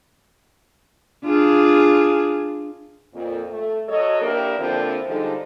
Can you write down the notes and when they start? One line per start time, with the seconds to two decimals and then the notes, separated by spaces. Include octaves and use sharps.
1.24 D4 F4 G#4
3.13 F2 A#2
3.49 A3
3.89 F#3 A4 C#5 D#5
4.22 A#3 D4 E4 G4 A#4
4.59 D3 F3 A#3 C4 D4 E4
5.08 D3 F3 G3 G#3 D#4 A4